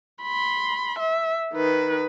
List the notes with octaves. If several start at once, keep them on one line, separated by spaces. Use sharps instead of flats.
B5 C6
E5
D#3 B4